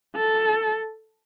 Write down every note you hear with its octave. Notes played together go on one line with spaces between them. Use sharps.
A4